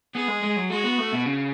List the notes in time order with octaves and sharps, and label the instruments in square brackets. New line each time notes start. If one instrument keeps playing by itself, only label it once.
[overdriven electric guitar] B3 [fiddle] G#4
[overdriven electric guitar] G#3
G#3
F#3
[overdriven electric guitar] G#3 [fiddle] F#4
[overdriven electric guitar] B3
A3
B2
C#3